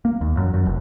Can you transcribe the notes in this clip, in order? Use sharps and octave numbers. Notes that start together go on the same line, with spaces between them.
A#3
D#2
F#2
F#2
F1